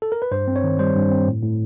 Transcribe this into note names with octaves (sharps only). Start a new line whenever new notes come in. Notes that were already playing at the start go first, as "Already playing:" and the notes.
A4
A#4
B4
G2 C5
C4
C#5
D#3
G3 C5
G2
C4
A2
A2